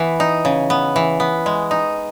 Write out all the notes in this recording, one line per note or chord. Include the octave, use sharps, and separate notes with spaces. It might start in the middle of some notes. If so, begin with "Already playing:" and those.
Already playing: E3 B3
D#4
C#3
B3
E3
B3
G#3
D#4